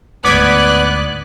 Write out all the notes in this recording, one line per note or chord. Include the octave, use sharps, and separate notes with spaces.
D2 G#2 B3 D5 D6 F#6 G#6 B6